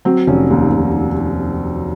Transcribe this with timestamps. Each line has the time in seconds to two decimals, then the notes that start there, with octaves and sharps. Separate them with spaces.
0.05 F#3 C4
0.27 F1 C#4
0.50 D#2
0.73 F1